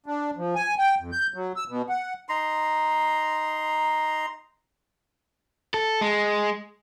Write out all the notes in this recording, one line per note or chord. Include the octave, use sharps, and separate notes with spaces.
D4
F3
G#5
G5
F2
G6
F#3
E6
B2
F#5
D#4 A#5 C6
A4
G#3